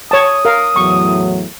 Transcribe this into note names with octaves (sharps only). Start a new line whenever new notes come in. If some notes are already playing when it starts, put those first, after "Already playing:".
C#5 A5 D#6
A#4 F5
E2 A2 F#3 C#6